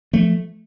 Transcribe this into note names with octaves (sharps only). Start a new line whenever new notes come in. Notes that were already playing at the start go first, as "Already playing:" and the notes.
F3 A3